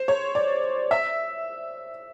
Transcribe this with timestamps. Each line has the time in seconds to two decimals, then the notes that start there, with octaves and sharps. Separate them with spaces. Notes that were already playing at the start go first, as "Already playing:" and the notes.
Already playing: C5
0.08 C#5
0.35 D5
0.91 E5